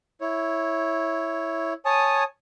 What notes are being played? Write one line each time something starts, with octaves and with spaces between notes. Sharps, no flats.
E4 C#5
C#5 G#5 A5 D#6